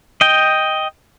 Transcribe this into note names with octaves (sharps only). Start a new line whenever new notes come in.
D#5 G5